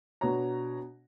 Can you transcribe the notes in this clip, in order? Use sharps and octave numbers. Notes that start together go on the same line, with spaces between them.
B2 D4 F#4 C#5 A#5